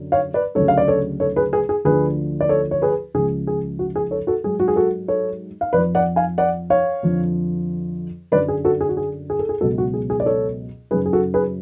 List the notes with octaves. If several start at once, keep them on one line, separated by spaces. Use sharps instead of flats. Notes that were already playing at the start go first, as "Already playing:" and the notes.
Already playing: F#2 D3 F#3
C#5 F5
B4 D5
D2 C#3 F#3 A4 C#5
F5
D5
A4 C#5
A4 C#5
G#4 B4
G#4 B4
G#4
D2 D3 F3 G#4 B4
D5
A4 C#5
C#5
G#4 B4
C#2 C#3 F3 G#4
G#4
F#4
G#4
A4 C#5
F#4 A4
G#2 F#3 G#4
F#4
G#4
F#4 A4
A4 C#5
F5
F2 F3 B4 D5
D5 F#5
F5 G#5
D5 F#5
C#5 F5
F2 D3 F3
F#2 D3 F#3 B4 D5
G#4
F#4 A4
G#4
F#4
G#4
G#4
A4
G#4
C#2 B2 F#3 F#4 A4
F#4
G#4
G#4
D5
A4 C#5
F#2 C#3 F#3 G#4 B4
G#4
F#4 A4
G#4 B4